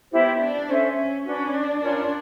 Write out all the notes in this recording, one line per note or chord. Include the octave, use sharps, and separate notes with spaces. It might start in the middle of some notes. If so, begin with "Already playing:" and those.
B3 E4 G4 C5 E5
D4
C#4 A4 C5 E5
C#4
C#4 D4 F#4 B4
D4
C#4 D4 F4 A#4